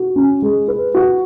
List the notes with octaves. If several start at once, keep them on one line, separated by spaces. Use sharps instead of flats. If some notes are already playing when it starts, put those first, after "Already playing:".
Already playing: F#4
C#4
G#3
B4
F#4